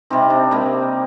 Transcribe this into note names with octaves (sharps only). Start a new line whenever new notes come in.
C3 G3 C4 D#4
D4
C3 G3 A#3 D#4